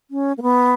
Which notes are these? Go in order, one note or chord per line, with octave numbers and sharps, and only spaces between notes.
C#4
A#3
B3